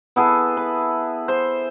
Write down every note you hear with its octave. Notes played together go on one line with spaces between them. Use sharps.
B3 E4 G#4 A4
B4
C5